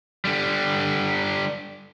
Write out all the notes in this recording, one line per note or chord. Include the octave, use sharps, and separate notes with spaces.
D3 G3